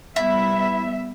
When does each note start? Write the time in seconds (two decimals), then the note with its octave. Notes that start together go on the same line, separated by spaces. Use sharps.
0.16 G3 B3 E4 E5